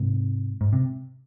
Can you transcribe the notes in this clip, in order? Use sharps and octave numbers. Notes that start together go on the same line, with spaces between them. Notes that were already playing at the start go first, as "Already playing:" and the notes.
Already playing: G#2 C3
G#2
C3